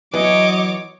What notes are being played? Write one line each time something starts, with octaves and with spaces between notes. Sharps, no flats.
E3 F#3 B3 C#5 D#5 D6